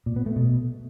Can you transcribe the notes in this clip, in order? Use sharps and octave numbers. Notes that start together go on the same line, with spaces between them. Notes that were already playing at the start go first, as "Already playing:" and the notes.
A#2
B3
A3
B2